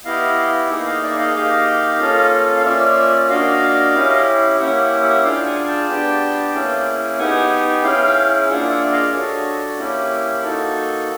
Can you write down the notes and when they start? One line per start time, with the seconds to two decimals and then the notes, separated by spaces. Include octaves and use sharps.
0.05 B3 E4 G4 D#5 F5
0.70 A#3 D#4 G#4 E5 F#5
0.86 D#5 F5
1.03 D5 E5
1.19 D#5 F5
1.35 A#3 D#4 G4 D#5 F5
2.00 A#3 C#4 F4 A4
2.57 F5
2.64 A#3 C#4 F4 D5 E5
3.29 A#3 D4 F#4 D#5 F5
3.95 C#4 E4 G4
4.59 A#3 C#4 E4 G4 E5 F#5
4.81 E5 F#5
5.03 E5 F#5
5.24 D4 F4 G#4 F5 G5
5.46 F#5 G#5
5.68 G5 A5
5.89 B3 D4 G4
6.54 A#3 C#4 E4 G#4
7.19 B3 D#4 G4 F#5 G#5
7.83 C#4 E4 G#4 F5 G5
8.48 A#3 D4 F4 G#4 E5 F#5
8.70 E5 F#5
8.92 D#5 F5
9.08 E5
9.14 D4 F#4 A4 C#5 D#5
9.78 A#3 C#4 E4 G4
10.43 A#3 D#4 F#4 A4